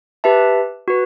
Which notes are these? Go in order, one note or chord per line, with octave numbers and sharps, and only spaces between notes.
G4 B4 E5 A5
F#4 B4